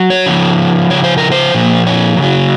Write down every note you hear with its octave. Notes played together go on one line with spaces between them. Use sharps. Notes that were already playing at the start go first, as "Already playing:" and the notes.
Already playing: F#3
C#5
C#3 F3
C#3 F3 C#5
C5
A#4
C5
A#2 F3
C#5
C#3 F#3